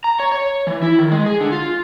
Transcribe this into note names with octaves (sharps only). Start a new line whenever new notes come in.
A#5
C#5
C#5
E3
E4
D#3
G#3
G#4
D3
F4